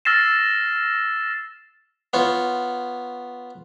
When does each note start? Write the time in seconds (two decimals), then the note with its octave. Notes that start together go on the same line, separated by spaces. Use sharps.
0.05 E6 F6 A6 A#6 C7 E7
2.13 B3 F4 C#5